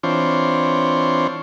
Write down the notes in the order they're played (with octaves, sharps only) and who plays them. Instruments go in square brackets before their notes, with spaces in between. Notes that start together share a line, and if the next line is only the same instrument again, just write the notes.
[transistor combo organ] E3 C4 D4 F4 C5 C#5